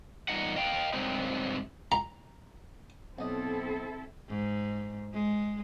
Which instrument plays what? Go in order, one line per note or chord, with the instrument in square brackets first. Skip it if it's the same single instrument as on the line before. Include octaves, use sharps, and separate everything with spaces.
[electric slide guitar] E2 A#2 G3 D#4 D#5 F#5
D#5 F5 G5
G2 C3 F#3 G#3 C4 D#4
[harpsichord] A#5
[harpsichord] B1 D#5 [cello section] C4 E4 A4
[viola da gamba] G#2
G#3